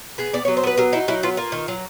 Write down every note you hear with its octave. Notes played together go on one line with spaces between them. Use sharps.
B3 G#4
B3 D5
F#3 C#5
C5
B3 B4
F#3 A#4
D#4 E4
F#3 E4
B3 F4
A#3 F4
D#3
F#3